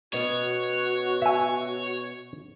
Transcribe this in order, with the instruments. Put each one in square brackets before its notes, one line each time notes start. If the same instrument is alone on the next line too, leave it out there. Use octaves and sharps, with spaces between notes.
[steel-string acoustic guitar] B2 B3 C#4 [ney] F#4 [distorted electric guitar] C#5
[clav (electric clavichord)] E5 G#5